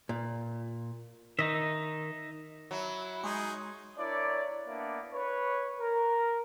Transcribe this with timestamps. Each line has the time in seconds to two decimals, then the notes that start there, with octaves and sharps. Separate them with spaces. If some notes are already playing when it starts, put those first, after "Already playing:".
0.09 A#2
1.39 D#3 D#4 D#5 E5
2.71 F#3 E4
3.23 G#3 D#4 G#4 C6 C#6
3.98 D4 E4 A#4 C#5 D5
4.68 A#3 B3 D4 E4 D5
5.12 B4 C#5
5.78 A#4